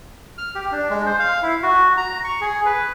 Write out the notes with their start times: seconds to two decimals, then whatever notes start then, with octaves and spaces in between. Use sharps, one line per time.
0.38 F6
0.55 G4
0.72 D4
0.90 G#3
1.06 C5
1.19 F5
1.42 E4
1.63 F#4
1.97 A#5
2.24 C#6
2.41 G#4
2.66 B4